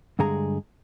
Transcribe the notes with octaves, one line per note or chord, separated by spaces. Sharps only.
G2 D3 G#3 G#4 A#5